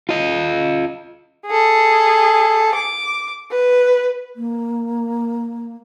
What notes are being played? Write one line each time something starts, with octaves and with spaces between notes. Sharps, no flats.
F4 D#5
G#4 A4
D6
B4
A#3